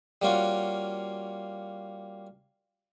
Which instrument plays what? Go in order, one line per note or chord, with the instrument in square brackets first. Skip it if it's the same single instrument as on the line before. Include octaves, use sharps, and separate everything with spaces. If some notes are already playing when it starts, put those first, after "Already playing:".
[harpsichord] G3 A#3 C#4 F4 F#4